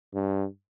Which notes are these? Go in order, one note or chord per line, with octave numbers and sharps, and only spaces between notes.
G2